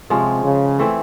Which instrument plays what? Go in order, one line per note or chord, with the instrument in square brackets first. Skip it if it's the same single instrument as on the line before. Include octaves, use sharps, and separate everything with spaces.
[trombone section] C3 [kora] F3 G#3 C#4
[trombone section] C#3
[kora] E3 A3 C4 E4